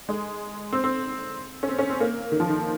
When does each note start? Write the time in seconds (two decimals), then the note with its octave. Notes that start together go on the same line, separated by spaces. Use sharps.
0.09 G#3
0.72 C4
0.84 C4
1.63 C#4
1.68 C4
1.79 C#4
1.90 C4
2.00 A#3
2.32 D#3
2.40 F3
2.49 D#3